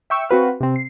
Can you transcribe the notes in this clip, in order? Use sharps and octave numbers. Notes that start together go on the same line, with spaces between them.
E5 G5 C#6 E6
C4 F#4 B4 F5
C3 C4
C7